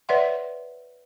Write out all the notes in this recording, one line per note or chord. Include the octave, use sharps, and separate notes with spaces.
B4 C#5 D5 E5 F#5 C6